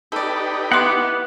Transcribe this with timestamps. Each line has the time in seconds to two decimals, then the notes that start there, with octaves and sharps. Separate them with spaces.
0.12 D#4 G4 A4 B4 D5
0.72 B3 E4 F#5 C6 D6